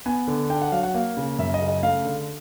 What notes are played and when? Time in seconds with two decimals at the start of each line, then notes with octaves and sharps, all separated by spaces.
0.06 B3 G#5
0.27 D3
0.50 D4 G5
0.62 F#5
0.72 F#3 F5
0.83 F#5
0.94 A#3 F5
1.17 C#3
1.38 F#2 E5
1.54 D#5
1.61 C#3
1.68 D#5
1.83 A3 F5
2.05 D3